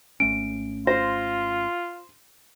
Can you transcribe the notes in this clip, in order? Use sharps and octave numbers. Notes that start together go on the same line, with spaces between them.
G#1 A3 C#4 D7
F4 C5 A#6